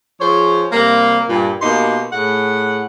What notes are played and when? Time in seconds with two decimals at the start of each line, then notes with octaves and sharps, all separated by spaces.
0.20 F3 G#4 C5 C#5
0.72 C3 G3 A#3
1.29 G2 A#2
1.62 B2 A#3 D#4 G4 C6
2.12 A2 G#4 F#5